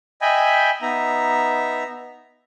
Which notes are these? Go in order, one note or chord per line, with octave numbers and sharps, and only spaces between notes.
D#5 E5 G5 G#5 B5
B3 D#4 E5 A#5